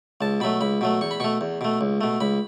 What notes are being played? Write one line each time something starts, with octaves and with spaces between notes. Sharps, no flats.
C#2 A5
B2 F#3 A3 B5
C#2 B5
B2 F#3 A3
E2 C#6
B5
B2 A3 C#6
E2
B2 A3
C#2
B2 A3
C#2 B5